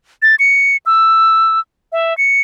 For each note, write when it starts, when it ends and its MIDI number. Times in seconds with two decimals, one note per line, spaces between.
0.22 0.35 93
0.39 0.77 97
0.86 1.60 88
1.92 2.16 76
2.18 2.41 97